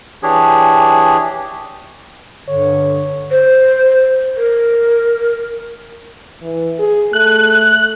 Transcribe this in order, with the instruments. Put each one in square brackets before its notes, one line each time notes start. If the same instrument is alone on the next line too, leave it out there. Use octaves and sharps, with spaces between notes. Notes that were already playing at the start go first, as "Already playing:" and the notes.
[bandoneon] E3 D4 G4 G#4 C#5
[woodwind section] G2 D3 [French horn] C#5
[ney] C5
A#4
[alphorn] E3
G#4
[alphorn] A3 [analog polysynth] F#6